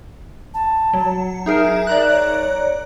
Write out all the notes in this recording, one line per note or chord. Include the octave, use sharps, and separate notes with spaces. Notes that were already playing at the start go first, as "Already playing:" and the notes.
A5
F#3
D#4 G#4 A#4 E5
D5 A#5 F#6
C#5